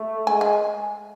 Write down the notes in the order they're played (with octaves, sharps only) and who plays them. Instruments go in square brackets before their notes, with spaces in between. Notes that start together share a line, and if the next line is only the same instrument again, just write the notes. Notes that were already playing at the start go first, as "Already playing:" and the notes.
Already playing: [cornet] A3
[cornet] G#3 [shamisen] G#5
[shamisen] G#5